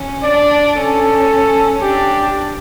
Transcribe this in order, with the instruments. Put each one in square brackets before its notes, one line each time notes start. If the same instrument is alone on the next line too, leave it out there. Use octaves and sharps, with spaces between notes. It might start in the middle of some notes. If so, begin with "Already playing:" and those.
Already playing: [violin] C#4
[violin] D4 [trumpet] D5
[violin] C#4 [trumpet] A4
[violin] D4 [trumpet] G4